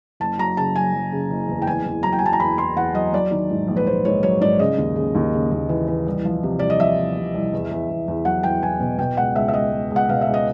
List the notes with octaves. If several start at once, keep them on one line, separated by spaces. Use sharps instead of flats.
F#1 A5
F#3 A#5
C#3 A5
F#3 G#5
F#3
C#3
F#1
E2
G5
E2 G#5
E2
F#3 A#5
G5
G#5
F#3 A5
A#5
E2 B5
E2 C6
E2 F#5
F#3 D#5
F#3 D5
D#3
G#2
A#1
B4
A#1 C5
G#2 C#5
F#3 C#5
G#2 D5
C#3 D#5
D#2
C#3
D#2
C#3
D#2
E3
E3
C2
F3
C3
C2 D5
D#5
F3 E5
C2
C3
C2
E2
E2
E2
E2
F#3 F#5
E2 G5
E2 G#5
B2
B2 G5
C#2 F#5
C#2 E5
E5
C#2 D#5
C#2
C#2
F#5
B2 F5
E5
C#2
D#5